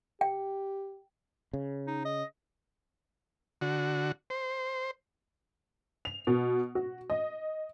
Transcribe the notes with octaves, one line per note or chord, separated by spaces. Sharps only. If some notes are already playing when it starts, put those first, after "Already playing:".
G4 G5
C#3
D#4
D#5
D3 F#4
C5
F7
B2
F#4
D#5